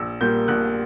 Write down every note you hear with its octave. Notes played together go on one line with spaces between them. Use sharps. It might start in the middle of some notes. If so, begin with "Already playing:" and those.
Already playing: A#1 E6
A#2 G3 A#3 G6
A#1 F#6